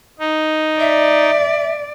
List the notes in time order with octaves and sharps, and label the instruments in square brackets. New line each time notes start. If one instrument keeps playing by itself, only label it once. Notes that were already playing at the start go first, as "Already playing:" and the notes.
[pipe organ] D#4
[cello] D5 [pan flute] E5